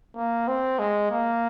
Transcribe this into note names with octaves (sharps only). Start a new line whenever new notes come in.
A#3
C4
G#3
A#3